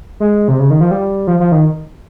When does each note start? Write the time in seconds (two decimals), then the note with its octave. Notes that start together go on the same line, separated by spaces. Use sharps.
0.20 G#3
0.48 C3
0.59 C#3
0.70 D#3
0.81 F3
0.91 G3
1.27 F3
1.40 F3
1.52 D#3